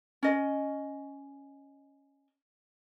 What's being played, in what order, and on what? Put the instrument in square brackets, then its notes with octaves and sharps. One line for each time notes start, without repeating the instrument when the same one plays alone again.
[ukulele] C#4 D#5